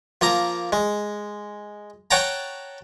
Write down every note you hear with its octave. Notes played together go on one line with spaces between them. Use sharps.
F3 A#3 A#5
G#3
C#5 F#5 G5 A5 A#5